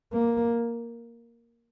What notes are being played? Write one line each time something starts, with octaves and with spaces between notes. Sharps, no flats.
A#3